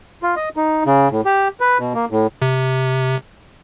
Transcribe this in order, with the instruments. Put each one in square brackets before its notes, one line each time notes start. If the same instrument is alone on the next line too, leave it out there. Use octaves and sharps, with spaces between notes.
[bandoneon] F4
D#5
D#4
C#3
A2
G4
B4
B2
A#3
A2
[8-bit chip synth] C3